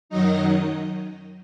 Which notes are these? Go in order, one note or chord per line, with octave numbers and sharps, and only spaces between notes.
F#2 D#3 F#3 D#4 D#5